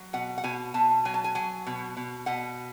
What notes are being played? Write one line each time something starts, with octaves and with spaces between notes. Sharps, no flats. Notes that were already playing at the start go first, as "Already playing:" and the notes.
Already playing: F#3
B2 F#5
F#5
B2 G#5
B2 A5
F#3 G#5
A5
G#5
F#3 G#5
B2
B2
B2 F#5